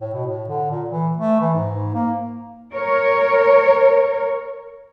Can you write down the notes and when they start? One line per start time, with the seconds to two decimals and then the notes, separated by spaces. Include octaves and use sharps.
0.01 A2
0.14 B2
0.27 A2
0.48 D3
0.71 A#2
0.90 E3
1.17 A3
1.41 E3
1.55 G#2
1.94 A#3
2.74 A#4 C#5